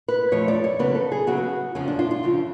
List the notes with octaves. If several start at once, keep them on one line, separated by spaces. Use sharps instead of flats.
B4
F2 F3 A3 C#5
D5
C#5
C#3 F#3 B3 B4
A4
G#4
C#3 F#3 B3 F#4
F2 C#3 F3 C#4
D4
F4
F4
F2 C#3 F3